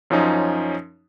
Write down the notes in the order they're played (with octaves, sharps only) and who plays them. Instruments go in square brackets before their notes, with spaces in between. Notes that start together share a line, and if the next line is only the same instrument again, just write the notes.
[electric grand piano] F#2 F3 C#4 D#4